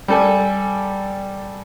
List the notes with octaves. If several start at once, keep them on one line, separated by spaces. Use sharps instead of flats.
G3 A4 G#5